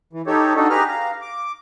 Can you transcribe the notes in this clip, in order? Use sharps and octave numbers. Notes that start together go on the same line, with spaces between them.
E3
D#4 G4 A4 C#5
D4 D#4 F#4 A4
G4 G#4 B4 A#5 F6
F5 A#5
D6